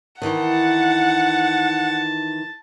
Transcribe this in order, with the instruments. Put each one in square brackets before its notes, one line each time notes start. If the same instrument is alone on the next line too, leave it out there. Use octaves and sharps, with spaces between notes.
[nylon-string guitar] D#3 E3 [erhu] F#5 [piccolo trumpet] A5